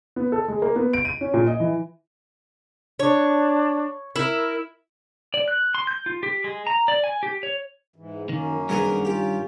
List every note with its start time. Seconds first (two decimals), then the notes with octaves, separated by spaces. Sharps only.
0.16 B3
0.32 A4
0.48 G#3
0.62 A#3
0.76 B3
0.93 D7
1.05 D#7
1.21 C#4
1.34 A#2
1.47 D#5
1.60 E3
2.99 D4 C#5
4.16 E4 A#4
5.34 D5
5.48 F#6
5.75 C6
5.87 G6
6.06 F4
6.23 G4
6.44 G#3
6.67 A#5
6.88 D5
7.04 G#5
7.23 G4
7.43 C#5
7.96 G#2 E3
8.29 F#2 D#3 A#3 C#4
8.69 G2 D#3 B3 G#4 A#4 D#5
9.05 C#4 F4 G4